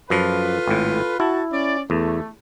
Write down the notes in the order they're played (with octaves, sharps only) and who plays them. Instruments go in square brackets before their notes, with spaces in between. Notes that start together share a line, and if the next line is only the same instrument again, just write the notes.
[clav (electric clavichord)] F#2 F3 [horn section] F4 A4 B4
[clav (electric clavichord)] G#1 A2
[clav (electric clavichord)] E4 [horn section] F#4 A5
[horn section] C#4 D5
[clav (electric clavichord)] E2 [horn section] A3